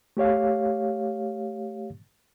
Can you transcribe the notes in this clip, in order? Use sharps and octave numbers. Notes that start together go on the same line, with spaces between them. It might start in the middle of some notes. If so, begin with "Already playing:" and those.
A3 G4 C#5 F5